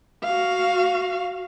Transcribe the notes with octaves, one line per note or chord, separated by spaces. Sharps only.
F#4 F5